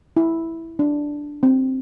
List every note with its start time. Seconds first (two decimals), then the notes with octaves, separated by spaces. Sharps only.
0.17 E4
0.79 D4
1.43 C4